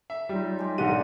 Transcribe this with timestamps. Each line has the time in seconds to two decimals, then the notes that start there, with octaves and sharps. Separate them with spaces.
0.10 E5
0.29 F#3 G3 D#4 F4
0.59 G#3 G4
0.78 B1 G#2 D3 G4 A#4 D5 F#5 D#7